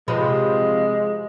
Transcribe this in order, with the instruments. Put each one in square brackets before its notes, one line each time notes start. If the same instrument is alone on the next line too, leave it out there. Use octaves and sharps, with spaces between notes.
[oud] C3 F3 B4 [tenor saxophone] G#3